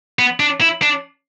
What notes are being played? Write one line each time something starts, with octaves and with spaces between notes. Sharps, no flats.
B3
D4
E4
D4